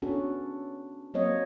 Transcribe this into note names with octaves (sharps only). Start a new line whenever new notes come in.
B3 C#4 D4 F#4 A4
F#3 A#3 C4 C#5 D#5